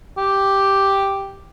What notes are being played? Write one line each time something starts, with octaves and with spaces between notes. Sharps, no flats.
G4